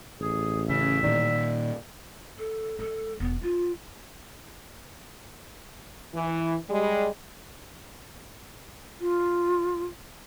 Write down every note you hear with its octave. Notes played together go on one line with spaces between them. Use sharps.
A1 G#4
C#3 E5
A#2 D#3 D5
A4
G#3 A4
E1 B3
D#4 F4
E3
G3 G#3
F4